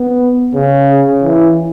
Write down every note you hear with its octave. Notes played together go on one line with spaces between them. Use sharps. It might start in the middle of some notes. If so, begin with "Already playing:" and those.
Already playing: B3
C#3
E3